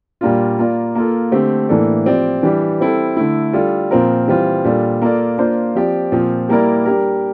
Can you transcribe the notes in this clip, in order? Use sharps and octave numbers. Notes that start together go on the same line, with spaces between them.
A#2 G3 A#3 D4 F4
A#3 F4 A#4 D5
A#3 F4 A4
D3 A3 C4 G4
A2 E3 A#3 D4 A4
F3 C4 G4 D5
E3 G3 D4 G4
G3 C4 E4 A4
D3 A3 E4
G3 D4 F4 A4
A#2 F3 C4 F4 A#4
E3 G3 C4 F4
A#2 G3 D4 F4 A4
A#3 F4 A4 D5
A#3 D4 F4 C5
F3 C4 G4 D5
A#2 F3 C4
G3 A#3 E4 A#4 D5
G3 D4 G4 A#4